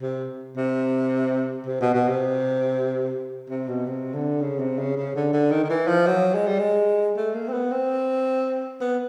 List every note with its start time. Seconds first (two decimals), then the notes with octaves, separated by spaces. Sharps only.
0.01 C3
0.57 C3
1.66 C3
1.81 B2
1.94 B2
2.08 C3
3.50 C3
3.68 B2
3.87 C3
4.14 D3
4.41 C#3
4.59 C3
4.79 C#3
4.97 C#3
5.15 D3
5.33 D3
5.51 D#3
5.64 D#3
5.70 E3
5.88 F3
6.07 F#3
6.34 G#3
6.47 G3
6.59 G#3
7.16 A3
7.35 A#3
7.49 C4
7.53 B3
7.72 C4
8.81 B3